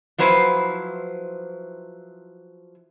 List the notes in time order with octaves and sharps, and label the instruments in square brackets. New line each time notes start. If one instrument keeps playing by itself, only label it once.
[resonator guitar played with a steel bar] F3 F#3 E4 B4 C5